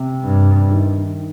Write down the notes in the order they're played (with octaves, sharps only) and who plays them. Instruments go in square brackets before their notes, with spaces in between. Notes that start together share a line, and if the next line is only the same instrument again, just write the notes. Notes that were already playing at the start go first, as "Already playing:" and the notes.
Already playing: [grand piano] C3
[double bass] G2
[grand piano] D#3